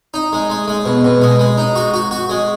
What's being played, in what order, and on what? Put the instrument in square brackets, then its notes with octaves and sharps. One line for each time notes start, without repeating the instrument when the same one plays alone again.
[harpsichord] D#4
G#3
G#3
G#3
B2
B2
G#3
G#3
D#4
F#4
F#4
F#4
G#3